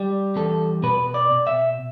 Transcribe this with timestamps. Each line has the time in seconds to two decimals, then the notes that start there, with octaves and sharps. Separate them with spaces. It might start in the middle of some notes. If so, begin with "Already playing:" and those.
Already playing: G3
0.36 E2 A4
0.83 B2 B4
1.14 D5
1.31 B2
1.47 E5